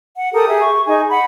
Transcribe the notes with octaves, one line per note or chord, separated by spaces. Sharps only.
F#5
G4 A4 A#4 D#6
G#4 E5
C#6
D#4 G#4 G#5
F#5 B5